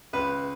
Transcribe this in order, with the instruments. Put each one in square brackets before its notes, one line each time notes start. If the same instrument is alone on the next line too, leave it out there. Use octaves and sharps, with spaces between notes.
[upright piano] C#2 [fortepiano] B4